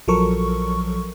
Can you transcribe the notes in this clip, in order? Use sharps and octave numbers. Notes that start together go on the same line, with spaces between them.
A#1 F3 F#3 A4 A#4 C#6